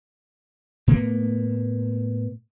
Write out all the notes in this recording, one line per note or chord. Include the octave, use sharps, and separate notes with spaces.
A2 A#3 B3